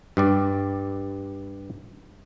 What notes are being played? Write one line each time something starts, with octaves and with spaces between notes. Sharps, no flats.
G2 G3 D5